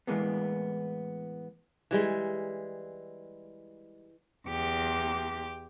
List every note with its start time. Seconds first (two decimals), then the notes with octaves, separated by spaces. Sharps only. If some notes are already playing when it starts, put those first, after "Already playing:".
0.07 A2 E3 G#3 A#3 B3
1.91 E3 G3 G#3
4.47 E2 G4